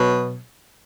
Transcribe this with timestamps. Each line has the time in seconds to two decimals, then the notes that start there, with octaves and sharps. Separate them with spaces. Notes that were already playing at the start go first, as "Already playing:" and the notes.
Already playing: B2 F#3